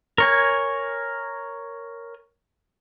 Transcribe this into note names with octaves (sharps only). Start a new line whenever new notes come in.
A#4 C#5 G#5